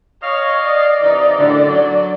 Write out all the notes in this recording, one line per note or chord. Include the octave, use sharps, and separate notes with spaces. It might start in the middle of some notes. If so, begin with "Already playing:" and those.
C#5 D#5 F5
D5
C3 E3 D#4
F#2 A2 D3
D3 F#3